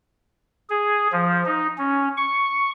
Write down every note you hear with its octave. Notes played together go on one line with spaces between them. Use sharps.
G#4
F3
D#4
C#4
C#6